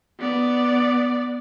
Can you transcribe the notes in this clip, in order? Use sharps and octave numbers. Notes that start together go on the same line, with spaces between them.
B3 D5